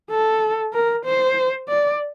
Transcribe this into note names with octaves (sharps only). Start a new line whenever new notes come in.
A4
A#4
C5
D5